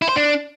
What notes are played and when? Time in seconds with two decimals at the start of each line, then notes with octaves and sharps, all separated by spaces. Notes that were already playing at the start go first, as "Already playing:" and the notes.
0.02 E4
0.09 C5
0.16 D4